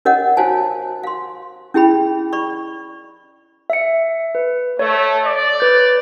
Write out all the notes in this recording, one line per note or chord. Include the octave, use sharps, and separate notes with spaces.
C#4 A#4 C#5 D#5 F#5
F#4 C5 F5 G#5 A5
F5 C6
C#4 E4 G#4 G5 B5
D5 B5 C#6
E5 C#7
B4
A3 C#5
D5
B4 G6